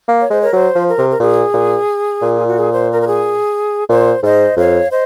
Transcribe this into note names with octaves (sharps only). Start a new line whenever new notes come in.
A#3
C#5
G#3 C5
A#4 C#5
F#3 C5
F3
A#4
C3
A#4
A#2 G#4
A#2
A#2
F4
F#4
G#4
C5
A#4
A#4
G#4
A#2 C5
G#2 C5 D#5
F2 C#5 F5
C5 D#5